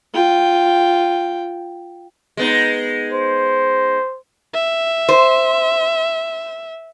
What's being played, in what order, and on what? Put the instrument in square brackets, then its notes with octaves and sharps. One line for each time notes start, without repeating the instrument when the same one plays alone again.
[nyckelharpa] F4 G5
[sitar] G#3 B3 D#4
[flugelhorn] C5
[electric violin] E5
[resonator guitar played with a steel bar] C5